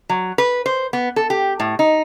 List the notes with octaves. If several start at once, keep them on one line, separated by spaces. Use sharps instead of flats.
F#3
B4
C5
B3
A4
G4
A2
D#4